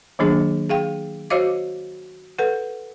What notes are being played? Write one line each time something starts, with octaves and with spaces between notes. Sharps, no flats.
D#3 F#3 A#3 D4 G#4
G#4 F5 G5
F#4 C5 C#5 D#5 F5 D6
A4 B4 F#5